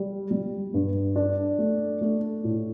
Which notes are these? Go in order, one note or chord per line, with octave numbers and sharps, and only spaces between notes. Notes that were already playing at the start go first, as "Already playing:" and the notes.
Already playing: G3
G3
G2
D4
A3
A3
A2